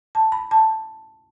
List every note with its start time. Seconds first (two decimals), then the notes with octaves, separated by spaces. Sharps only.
0.15 A5
0.32 B5
0.51 A5